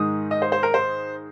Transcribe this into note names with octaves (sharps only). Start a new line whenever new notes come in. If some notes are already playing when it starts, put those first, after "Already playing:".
Already playing: G#2 D#3 G#3 D#4 D#6
D#5
C5
C5
A#4
C5